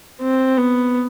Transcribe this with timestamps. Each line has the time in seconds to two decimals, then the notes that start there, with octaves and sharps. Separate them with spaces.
0.21 C4
0.57 B3